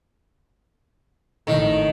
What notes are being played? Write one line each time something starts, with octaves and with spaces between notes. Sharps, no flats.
G#1 A2 D#3